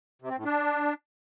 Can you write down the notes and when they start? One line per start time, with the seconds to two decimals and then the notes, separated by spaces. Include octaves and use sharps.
0.22 C3
0.29 C4
0.37 A2
0.45 D4